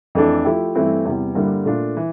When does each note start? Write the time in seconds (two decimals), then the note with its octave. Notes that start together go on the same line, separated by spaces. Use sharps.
0.15 F2 E3 A3 D4 A4
0.45 F3 A3 E4 G4
0.75 G2 E3 A3 C4 E4
1.05 E2 C3 G3
1.35 G2 D3 G3 A#3 E4
1.65 A#2 A3 D4 F4
1.97 E3